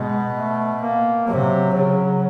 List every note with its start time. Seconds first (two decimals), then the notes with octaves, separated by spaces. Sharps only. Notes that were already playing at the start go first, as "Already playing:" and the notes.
Already playing: B2 G#3
0.34 A3
0.82 A#3
1.28 C3 F#3
1.74 C#3